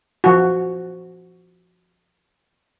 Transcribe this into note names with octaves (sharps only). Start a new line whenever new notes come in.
F3 F#4